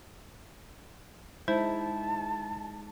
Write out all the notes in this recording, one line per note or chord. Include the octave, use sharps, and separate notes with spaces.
G#3 D#4 E4 C5 A5